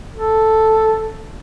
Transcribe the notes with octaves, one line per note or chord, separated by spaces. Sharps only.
A4